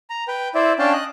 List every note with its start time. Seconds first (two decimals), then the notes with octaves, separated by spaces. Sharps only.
0.10 A#5
0.28 B4 G5
0.55 E4 C5 D5 E5
0.79 C#4 D4 F5 G5 A5
0.93 D#5 F#6